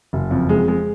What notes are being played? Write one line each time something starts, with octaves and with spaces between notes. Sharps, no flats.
F#1
F2
G#3
G#3